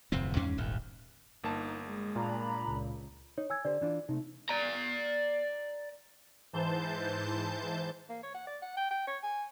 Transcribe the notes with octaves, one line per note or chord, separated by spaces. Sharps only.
D1 F2 C3 C4
E2 G#2 C#4
D#1 G#1 D#2
G1 A#3 D#4 A5
G#3
A#2 D4 A#5 B5
C#2
D#4 C#5
C#5 G#5 E6 G#6
D3 G4 C5 D5
E3 D4 F4
C3 A3 D#4
D5 A#5
G#2 E3 C5 A5 G6
A#3
C#5
F#5
D5
F#5
G5
G5
C#5
G#5